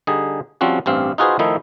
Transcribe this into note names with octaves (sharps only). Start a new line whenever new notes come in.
D3 G3 D#4 G#4
F3 G3 C4 C#4 F#4
A1 G2 C4 F5
D#4 F4 F#4 G#4 B4 C5
D#3 F3 A3 D#4 E4